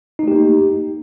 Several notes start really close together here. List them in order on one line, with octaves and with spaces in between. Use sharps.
D#4 A3 G4 A#3